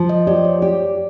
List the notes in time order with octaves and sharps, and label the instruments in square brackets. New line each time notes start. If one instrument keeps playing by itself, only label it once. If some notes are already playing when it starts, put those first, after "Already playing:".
Already playing: [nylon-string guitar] F3
[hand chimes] D#5
[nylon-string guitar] G4 [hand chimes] D5
[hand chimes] C#5
[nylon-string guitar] G4 [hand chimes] D5